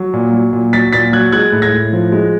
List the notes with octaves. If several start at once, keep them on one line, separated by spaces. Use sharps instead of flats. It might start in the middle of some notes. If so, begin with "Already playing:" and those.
Already playing: F#3
A#2
F#3
A#2
F#3 A6 B6
A#2 A6 B6
F#3 F#6 G#6
G#3 F#6 G#6
A2
G#6 A#6
A2
F3
G#3